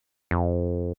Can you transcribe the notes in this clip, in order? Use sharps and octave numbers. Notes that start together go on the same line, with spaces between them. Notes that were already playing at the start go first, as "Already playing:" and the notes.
F2